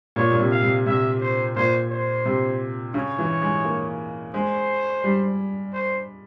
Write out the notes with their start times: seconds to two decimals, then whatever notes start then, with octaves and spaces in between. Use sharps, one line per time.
0.16 A#2 C#5
0.31 A#2
0.40 C3
0.51 F5
0.63 C3
0.86 C3 E5
1.21 C5
1.55 A#2 C5
1.90 C5
2.26 C3
2.94 C#3 C#5
3.18 E3
3.42 G#3
3.65 A#3
4.34 G#3 C5
5.04 G3
5.73 C5